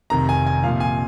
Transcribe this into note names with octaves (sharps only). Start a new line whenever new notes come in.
F1 F2 C3 D#3 A#5
G#5
G#5
C2 A#2 F3 F5
G#5